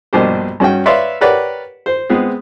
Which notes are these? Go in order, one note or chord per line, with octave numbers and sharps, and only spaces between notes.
A#1 G2 B2 D4 G4 C5
G2 C#4 F#4 F#5 G5
B4 C#5 D5 E5 F5 C6
G4 A#4 B4 C#5 D5 F#5
C5
G#3 B3 C4 G#4